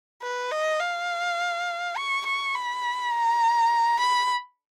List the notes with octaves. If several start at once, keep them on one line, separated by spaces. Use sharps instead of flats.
B4
D#5
F5
C#6
C#6
B5
A#5
B5